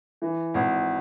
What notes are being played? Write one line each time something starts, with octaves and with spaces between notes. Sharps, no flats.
E3
G#1